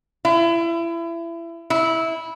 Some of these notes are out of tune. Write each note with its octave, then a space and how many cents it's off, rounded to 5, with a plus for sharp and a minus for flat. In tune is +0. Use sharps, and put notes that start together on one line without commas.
E4 +30
E4 -15